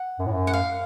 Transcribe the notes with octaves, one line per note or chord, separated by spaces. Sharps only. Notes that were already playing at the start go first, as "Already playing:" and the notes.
Already playing: F#5
F#2
A2
F#2
F#5
F5